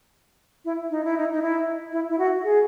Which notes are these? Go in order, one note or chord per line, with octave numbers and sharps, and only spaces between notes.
E4
D#4
E4
D#4
D#4
E4
E4
E4
F#4
G#4